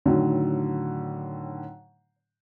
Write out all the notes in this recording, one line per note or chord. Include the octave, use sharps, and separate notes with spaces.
A2 D3 D#3 F#3